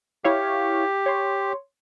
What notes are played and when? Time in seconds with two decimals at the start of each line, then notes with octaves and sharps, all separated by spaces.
0.24 E4 G4 C#5 F5
1.06 C#5 C6